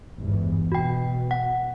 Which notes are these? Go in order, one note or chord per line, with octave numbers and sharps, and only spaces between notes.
G1 E2 G#2
B2 F#4 G5
F#5